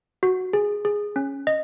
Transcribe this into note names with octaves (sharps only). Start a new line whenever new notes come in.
F#4
G#4
G#4
C#4
D#5